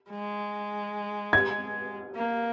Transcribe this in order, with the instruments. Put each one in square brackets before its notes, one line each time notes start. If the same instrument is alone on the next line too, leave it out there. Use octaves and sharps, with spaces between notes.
[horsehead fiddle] G#3
[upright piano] G#6
[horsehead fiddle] A#3